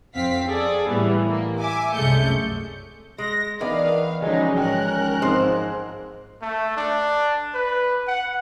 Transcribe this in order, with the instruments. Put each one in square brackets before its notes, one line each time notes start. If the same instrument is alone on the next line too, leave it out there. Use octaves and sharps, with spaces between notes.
[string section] F2 C4 F5 B6
G#4 A4 D5
A2 E3 G3 B3
A#3
E5 G#5 D6
C2 F#2 G#3 A3 G6 C#7
[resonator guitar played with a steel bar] G#3 [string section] A#6
[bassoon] D#3 [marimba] E3 A#4 [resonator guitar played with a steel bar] B3 D4 [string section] F5
[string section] D3 F#3 D#4 [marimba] F3 C#4 [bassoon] G#3
[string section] G#1 A#4 F#6 [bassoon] C#4 [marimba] G5
[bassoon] G#2 [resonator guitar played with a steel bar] F3 C4 C5
[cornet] A3
D4
B4
F#5